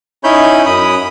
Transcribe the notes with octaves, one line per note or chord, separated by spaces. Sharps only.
C#4 D#4 E4 C#5 B5 G6
F#2 B5 D#6